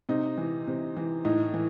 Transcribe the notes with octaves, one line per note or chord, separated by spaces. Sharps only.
C3 D#4
E3
C3
E3
A2 D#4
E3